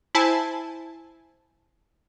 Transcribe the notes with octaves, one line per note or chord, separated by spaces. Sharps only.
E4 C5 G#5 A5